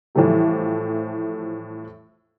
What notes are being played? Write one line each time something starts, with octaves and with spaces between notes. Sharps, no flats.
A2 E3 F3 G3 A3 G4